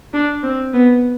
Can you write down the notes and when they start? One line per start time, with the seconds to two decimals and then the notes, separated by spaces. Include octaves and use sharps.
0.13 D4
0.43 C4
0.73 B3